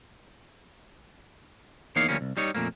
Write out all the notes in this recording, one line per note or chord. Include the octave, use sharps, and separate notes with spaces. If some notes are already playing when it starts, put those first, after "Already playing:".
E2 A#3 D#4 C#5 F5
D2 F3 G3 A#3 C#4
C2
G3 D#4 C#5
F2 A#2 A3 A#3